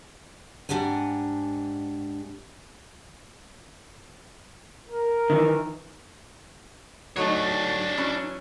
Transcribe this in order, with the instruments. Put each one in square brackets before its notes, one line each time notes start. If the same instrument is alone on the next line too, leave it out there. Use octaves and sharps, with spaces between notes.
[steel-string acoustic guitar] G#2 A#3 D4 G4 F#5 G#5
[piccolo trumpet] A#4
[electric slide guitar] D#3 E3
[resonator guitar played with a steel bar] F#3 A3 D#4 [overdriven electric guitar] D4 C#5
[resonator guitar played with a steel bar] E3 F#3 C#4